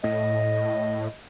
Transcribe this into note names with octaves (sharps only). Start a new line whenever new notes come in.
A2 D#5